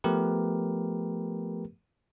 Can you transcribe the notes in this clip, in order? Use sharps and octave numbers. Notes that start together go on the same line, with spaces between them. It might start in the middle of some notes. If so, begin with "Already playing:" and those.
F3 A3 B3 G4 A#4 B4